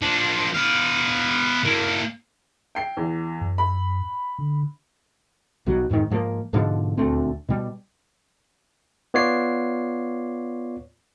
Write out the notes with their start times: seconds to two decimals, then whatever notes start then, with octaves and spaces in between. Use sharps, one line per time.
0.02 F3 D4
0.54 B3 F5
1.64 A#3 E4
2.75 G5 C7
2.97 E2
3.41 F#2
3.58 B5
4.38 D3
5.66 B1 B2 F#3 G3
5.90 F2 G#2 C3 D#3
6.10 G#2 F3 G3 A#3
6.53 G#2 B2 D3 F3
6.97 D#1 D2 A3 C4
7.49 B2 G3
9.14 B3 F4 C#5 D5 C7